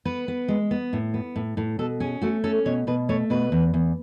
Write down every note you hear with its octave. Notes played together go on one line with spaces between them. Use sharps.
B3 B4
B3
G#3
B3
A2
B3
A2
A2
B2 A4
C#4 G#4
A3 F#4
C#4 A4
B2 C#5
B2 B4
A3 C#5
B2 B4
E2
E2